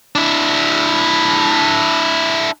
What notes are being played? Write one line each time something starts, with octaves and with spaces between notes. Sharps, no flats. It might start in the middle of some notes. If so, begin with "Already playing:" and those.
D4 E4